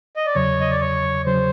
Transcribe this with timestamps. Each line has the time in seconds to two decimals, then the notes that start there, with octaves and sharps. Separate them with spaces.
0.16 D#5
0.26 D5
0.35 E2 C#3 F#3 C#5
0.61 D#5
0.71 D5
0.81 C#5
1.26 C#3 F#3 C5